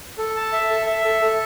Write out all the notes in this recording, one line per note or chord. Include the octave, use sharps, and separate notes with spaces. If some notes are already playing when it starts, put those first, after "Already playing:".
A4
A5
E5
A4
E5
A4
A4